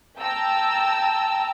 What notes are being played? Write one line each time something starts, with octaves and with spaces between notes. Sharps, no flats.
G5 A5 A#5 E6